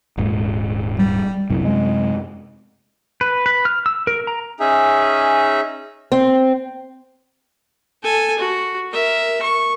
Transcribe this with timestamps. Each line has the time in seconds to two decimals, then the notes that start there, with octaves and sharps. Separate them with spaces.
0.17 D#1 G#2 G#3
0.99 G3
1.50 C2 F#2 C3
1.64 G#3
3.21 B4
3.46 B4
3.65 F6
3.86 E6
4.07 A#4
4.27 A#5
4.60 C#4 D#4 G#4 E5
6.12 C4
8.03 A4 G#5
8.39 F#4
8.92 A#4 E5
9.42 C#6